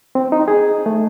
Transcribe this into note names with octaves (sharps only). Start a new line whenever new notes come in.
C4
D#4
G#4
A3